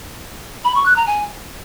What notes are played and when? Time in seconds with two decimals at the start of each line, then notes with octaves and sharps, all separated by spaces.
0.64 B5
0.75 C#6
0.86 F#6
0.96 A#5
1.07 G#5